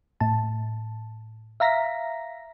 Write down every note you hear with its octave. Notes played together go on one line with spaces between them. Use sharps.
A2 A5
E5 F5 A#5 A#6 B6